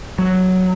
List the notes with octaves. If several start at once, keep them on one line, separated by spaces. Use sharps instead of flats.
F#3